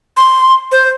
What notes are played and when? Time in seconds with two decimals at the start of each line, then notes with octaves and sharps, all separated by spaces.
0.17 C6
0.72 C5